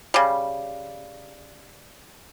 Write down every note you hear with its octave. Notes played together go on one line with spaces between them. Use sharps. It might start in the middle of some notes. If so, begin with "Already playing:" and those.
C#3 G3